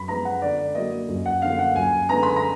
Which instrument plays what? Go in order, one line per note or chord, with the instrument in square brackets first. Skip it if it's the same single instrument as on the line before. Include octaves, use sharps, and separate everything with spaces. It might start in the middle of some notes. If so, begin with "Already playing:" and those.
Already playing: [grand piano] F#2 B5
F3 G#3 B3 A#5
F#5
D3 D5
F#3 A#3 D#5
F#2
F#5
D3 F3 A#3 F5
F#5
F#2 G#5
D3 G#3 B3 A#5
B5
A#5